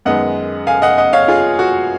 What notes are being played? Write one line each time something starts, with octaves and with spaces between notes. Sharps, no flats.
F#2 D#3 G#3 B3 D#5 F#5
F5 G#5
D#5 F#5
D#5 F#5
C#5 F5
F4 G#4
F#4